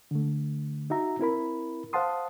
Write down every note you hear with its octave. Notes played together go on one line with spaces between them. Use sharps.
D3 A3
D#4 F#4 E5 A#5
C4 E4 A#4 B5
C5 F5 F#5 A5 C6 D#6